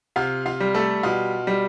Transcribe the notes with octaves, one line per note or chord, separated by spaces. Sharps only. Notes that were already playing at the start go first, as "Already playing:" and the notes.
C3 F4 F5
F4 F5
G3
A3 A4
B2 F4
G3